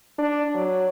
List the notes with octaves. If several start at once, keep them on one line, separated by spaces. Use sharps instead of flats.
D4
F#3